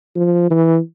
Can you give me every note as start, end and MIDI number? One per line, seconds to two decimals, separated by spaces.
0.16 0.49 53
0.50 0.79 52